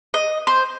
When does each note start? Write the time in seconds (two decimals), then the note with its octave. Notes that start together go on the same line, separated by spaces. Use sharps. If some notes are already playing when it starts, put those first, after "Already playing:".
0.14 D#5
0.47 C5